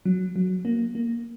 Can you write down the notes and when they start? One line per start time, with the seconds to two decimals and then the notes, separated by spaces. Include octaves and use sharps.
0.05 F#3
0.36 F#3
0.65 A#3
0.95 A#3